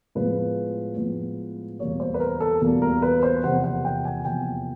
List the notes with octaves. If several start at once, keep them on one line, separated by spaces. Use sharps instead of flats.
A2 F3 G#3 B3 B4
A2 F3 G#3 B3
E2 B2 G3 A#3 C#5
C5
B4
A#4
A4
E2 B2 G3 A#3
A#4
B4
C5
E2 C3 F3 A#3 F#5
F#5
G5
G#5
E2 C3 F3 A#3 G5